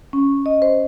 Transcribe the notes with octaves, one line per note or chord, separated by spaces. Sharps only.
C#4
D#5
C5